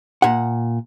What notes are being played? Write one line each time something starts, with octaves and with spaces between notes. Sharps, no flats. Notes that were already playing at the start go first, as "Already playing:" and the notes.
A#2 F#5